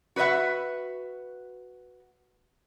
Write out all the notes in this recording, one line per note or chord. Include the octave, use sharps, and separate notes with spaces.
F#4 B4 C5 E5 F#5